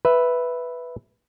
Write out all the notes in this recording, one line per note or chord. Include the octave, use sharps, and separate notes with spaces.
B4 E5